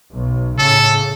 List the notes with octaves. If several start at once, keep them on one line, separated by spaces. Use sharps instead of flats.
B1
A2 C#3 A4